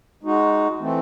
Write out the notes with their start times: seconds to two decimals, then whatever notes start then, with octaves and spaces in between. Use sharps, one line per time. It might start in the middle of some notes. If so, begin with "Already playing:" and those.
0.23 G#3 D#4 F#4
0.79 E3 A3 C4